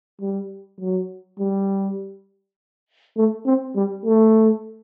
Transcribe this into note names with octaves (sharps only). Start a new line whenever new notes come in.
G3
F#3
G3
A3
C4
G3
A3